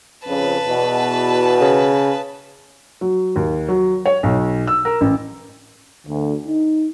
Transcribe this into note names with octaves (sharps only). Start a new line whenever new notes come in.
F2 C#3 B4 A5
E2 B2
C#3
F#3
D#2
F#3
C#5
B1
E6
A#4
A1
D2
D#4